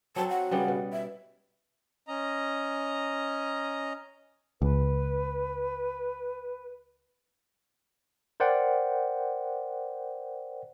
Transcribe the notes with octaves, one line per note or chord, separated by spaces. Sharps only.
F#3 C4 A5
F#5
C#3 G3 B3
B2
E5
C#4 D#5 A#5
C#2 B4
A#4 C5 D5 F#5 G5